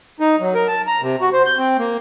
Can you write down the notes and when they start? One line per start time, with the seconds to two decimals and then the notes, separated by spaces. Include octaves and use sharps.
0.20 D#4
0.40 F#3
0.54 A#4
0.68 A5
0.87 A#5
1.02 C3
1.21 F#4
1.33 C5
1.46 G6
1.58 C4
1.79 A#3